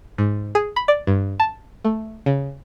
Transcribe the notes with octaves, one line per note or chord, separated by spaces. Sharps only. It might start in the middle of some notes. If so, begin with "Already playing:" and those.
G#2
G#4
B5
D5
G2
A5
A3
C#3